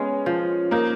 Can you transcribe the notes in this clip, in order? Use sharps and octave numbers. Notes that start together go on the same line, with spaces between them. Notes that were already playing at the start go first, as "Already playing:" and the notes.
Already playing: G#3 B3 C#4
F3
A#3 D#4